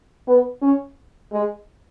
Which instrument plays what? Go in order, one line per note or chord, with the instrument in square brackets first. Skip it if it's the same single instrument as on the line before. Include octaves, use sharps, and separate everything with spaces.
[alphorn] B3
C#4
G#3